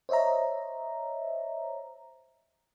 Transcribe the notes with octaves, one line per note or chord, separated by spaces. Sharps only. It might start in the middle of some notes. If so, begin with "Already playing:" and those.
C5 C#5 D#5 E5 A#5